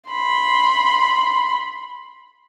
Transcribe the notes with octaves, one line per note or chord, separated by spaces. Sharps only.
B5 C6